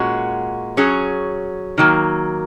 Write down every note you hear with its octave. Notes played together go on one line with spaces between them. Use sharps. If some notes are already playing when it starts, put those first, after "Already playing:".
Already playing: A#2 G#3 C#4 F#4
F#3 C#4 G#4
D#3 F#3 A#3